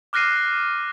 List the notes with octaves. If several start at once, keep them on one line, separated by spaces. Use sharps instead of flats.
D6 F6 F#6 A#6 C7 D#7